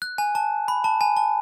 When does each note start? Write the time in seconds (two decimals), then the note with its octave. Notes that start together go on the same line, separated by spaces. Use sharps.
0.02 F#6
0.18 G#5
0.35 A5
0.68 B5
0.84 A5
1.01 G#5
1.17 A5